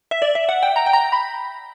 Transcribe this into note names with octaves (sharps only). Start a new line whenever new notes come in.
E5
D5
E5
F#5
G5
A#5
G5
A#5
B5